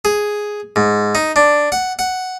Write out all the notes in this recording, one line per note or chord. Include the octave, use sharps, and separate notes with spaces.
G#4
G#2
D#4
D4
F#5
F#5